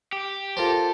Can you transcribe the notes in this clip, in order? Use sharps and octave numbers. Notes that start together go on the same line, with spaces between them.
G4
F4 A4 A#4 C5